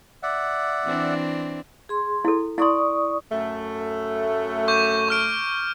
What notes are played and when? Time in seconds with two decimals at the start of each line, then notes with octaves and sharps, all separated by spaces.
0.23 D5 E5 F#5
0.84 E3 C4 D4
1.89 G#4 C6
2.25 E4 A4
2.58 E4 D5 C6 C#6 D#6
3.31 F#2 A3
4.68 C#6 D6 G6
5.09 C#6 F6 D7